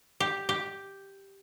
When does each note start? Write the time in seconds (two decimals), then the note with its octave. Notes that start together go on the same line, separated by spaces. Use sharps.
0.20 G4
0.49 G4